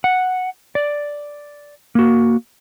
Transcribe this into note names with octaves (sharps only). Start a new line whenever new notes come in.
F#5
D5
A#3 F#4